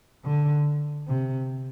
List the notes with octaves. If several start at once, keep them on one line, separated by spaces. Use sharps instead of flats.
D3
C3